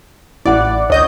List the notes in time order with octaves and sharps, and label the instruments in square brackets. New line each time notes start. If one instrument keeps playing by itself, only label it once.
[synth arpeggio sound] A1 D5 [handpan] E4 F#5
[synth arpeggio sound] D2 D#5 G6 [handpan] C#5